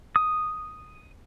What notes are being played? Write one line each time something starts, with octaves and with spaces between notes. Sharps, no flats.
D#6